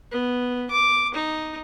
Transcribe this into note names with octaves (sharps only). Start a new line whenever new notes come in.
B3
D6
D#4